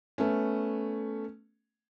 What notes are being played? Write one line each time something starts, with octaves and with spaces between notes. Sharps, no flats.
A3 B3 C#4